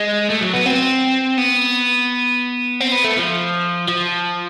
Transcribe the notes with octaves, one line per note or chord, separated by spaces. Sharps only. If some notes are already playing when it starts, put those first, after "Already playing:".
Already playing: G#3
A3
F#3
B3
C4
B3
C4
B3
A3
F3
F3